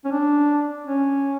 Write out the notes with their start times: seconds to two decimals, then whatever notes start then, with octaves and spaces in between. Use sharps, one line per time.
0.05 C#4
0.12 D4
0.87 C#4